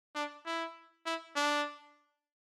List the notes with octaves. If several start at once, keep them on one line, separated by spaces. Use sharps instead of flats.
D4
E4
E4
D4